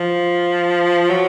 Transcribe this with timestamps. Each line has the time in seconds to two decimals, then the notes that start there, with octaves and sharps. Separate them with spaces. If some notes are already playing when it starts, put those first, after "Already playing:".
Already playing: F3
1.10 F#3